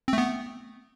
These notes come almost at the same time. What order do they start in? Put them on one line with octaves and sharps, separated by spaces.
C4 A3 B3